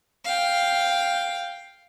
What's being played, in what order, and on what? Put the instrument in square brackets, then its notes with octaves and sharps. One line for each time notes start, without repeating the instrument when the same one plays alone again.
[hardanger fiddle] F5 G5